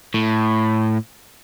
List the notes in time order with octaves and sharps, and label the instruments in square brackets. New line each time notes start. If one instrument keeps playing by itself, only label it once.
[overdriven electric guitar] A2